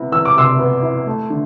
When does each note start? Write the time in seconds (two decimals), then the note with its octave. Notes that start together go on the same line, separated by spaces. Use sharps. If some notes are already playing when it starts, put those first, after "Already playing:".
Already playing: C3 B3 E4
0.12 E3 E6
0.25 D6
0.36 C3 C6 E6
0.59 B3
0.82 E4
1.07 A3
1.30 D3